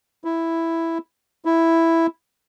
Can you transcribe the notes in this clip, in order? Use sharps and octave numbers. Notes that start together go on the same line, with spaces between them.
E4
E4